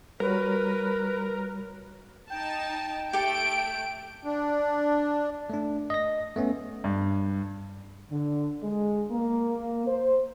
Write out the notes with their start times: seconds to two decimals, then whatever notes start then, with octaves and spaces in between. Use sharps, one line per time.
0.20 G3 F#4 A#4 B4 C#5
2.30 D#4 G5 A5
3.13 A3 G4 A4 D7
4.24 D4
5.50 A3 D4
5.90 D#5 A#6
6.36 A3 B3 C#4
6.84 G2
8.10 D3
8.63 G#3
9.11 A#3
9.87 C5